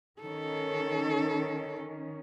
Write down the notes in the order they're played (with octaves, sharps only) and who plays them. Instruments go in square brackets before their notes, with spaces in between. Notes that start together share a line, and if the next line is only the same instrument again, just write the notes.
[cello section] D#3 C#4 [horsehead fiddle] A4